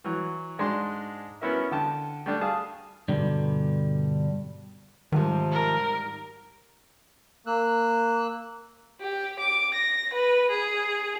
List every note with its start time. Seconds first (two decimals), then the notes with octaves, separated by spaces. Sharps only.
0.04 E3 F#3
0.59 G#2 G#3 D4 C6
1.41 B3 C#4 E4 F#4 A#4 E5
1.71 D3 G5 A5
2.26 G3 A3 D4
2.41 G#4 F5 A5
3.08 G2 B2 D3 G3
5.12 G#2 C3 D#3 F3 G3
5.52 A#4
7.47 A#3 E6 F#6
9.00 G4
9.39 D6
9.74 A#6
10.13 B4
10.50 G#4